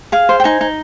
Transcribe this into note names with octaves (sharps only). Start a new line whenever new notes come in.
G#4 F5
C5
G5
D#4 G#5
D#4